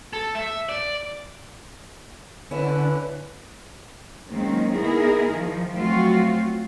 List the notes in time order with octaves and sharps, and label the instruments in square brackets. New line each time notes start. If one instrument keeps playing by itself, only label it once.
[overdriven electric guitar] A4
E5
D5
[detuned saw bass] D3 [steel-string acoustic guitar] C#4 E4 [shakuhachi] B4
[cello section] D#3 F#3 G#3 A#3 C4 C#4
B3 D#4 E4 G#4 A#4
D#3 F3
F#3 A3 C4 F4 F#4